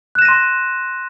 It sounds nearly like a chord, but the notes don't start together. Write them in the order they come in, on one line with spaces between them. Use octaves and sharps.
F#6 E7 A#6 D#7 C6